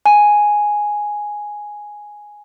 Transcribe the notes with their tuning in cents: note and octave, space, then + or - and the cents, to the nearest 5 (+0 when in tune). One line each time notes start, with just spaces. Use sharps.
G#5 +0